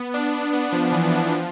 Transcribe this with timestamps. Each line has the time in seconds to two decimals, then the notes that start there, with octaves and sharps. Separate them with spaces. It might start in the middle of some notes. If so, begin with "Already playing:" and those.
Already playing: B3
0.14 D4
0.53 B3
0.72 F3
0.92 E3
1.04 E3
1.12 F3
1.32 F3